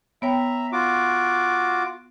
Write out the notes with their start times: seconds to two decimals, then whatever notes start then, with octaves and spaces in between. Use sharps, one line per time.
0.22 B3 C#5 E5 G5 A#5
0.72 F4 F#4 D6